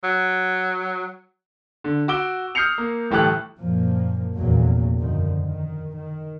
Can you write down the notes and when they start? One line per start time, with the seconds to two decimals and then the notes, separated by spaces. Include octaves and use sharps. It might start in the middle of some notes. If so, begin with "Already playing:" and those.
0.03 F#3
1.84 D3
2.08 F#4 D6 E6 D7 G7
2.55 D#6 F6 G6 C7 C#7 F7
2.78 A#3
3.11 G1 A2 E3 G4 A4 F#6
3.59 F#2 A#2 F3 A#3
4.35 F1 A#1 E2 A#2 F#3 A#3
4.99 F#2 D3 D#3 F3
5.46 D#3
5.94 D#3